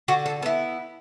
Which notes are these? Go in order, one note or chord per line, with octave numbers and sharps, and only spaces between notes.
D3 F#4
A4
B3 E4 A4